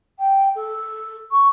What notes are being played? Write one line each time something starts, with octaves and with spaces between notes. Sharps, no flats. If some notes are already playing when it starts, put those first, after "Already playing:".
G5
A4
C#6